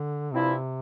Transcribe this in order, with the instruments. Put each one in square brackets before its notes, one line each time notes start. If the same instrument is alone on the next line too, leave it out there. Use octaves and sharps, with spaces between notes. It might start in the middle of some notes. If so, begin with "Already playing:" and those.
Already playing: [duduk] D3
[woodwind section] G2 F3 C4 E4 [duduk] C3